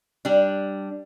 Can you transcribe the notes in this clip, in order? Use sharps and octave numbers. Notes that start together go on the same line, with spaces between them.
G3 D4